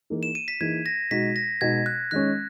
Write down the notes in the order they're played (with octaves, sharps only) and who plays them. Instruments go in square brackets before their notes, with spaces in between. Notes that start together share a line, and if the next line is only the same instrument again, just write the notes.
[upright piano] E3 A#3 D#4 G#4
[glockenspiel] E7
D#7
B6
[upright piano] E3 A#3 D#4 G#4 [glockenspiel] G#6
[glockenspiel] A#6
[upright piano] B2 G#3 D#4 F#4 [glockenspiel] B6
[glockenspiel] A#6
[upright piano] B2 G#3 D#4 F#4 [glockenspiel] G#6
[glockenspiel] F#6
[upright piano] D#3 G#3 C#4 [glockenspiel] F#6